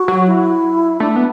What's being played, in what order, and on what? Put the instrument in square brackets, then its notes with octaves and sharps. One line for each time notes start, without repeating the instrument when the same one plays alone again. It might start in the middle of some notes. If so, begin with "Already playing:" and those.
Already playing: [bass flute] F#4
[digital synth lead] F#3
[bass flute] E4
[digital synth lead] A3 [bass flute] D4
[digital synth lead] B3